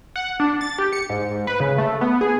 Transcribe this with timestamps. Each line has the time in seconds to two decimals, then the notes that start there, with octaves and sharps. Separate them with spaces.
0.16 F#5
0.40 D4
0.61 A6
0.79 G4
0.92 C#7
1.10 G#2
1.47 B4
1.60 C#3
1.78 A3
2.01 B3
2.21 G#4